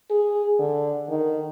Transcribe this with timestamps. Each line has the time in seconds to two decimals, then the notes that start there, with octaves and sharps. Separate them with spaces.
0.11 G#4
0.59 D3
1.09 D#3